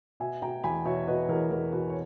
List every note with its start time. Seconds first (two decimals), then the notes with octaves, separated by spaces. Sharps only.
0.20 B2 E5 G#5
0.42 B2 G5 A#5
0.64 E2 G#5 B5
0.85 B2 C#5 E5
1.07 B2 B4 D#5
1.29 E2 A#4 C#5
1.51 E2 A#4
1.73 B2 B4
1.89 C#5